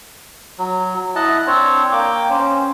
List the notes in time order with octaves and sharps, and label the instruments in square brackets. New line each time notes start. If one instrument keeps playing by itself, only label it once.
[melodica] F#3
[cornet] E4 [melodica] D#5 F#5 A5
[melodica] C4 C5 C#5 [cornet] D4
[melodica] A#3 D6 [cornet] G5
[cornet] C#4 [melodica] C5